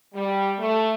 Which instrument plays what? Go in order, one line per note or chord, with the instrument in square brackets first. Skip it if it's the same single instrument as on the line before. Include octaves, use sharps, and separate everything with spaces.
[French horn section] G3
A3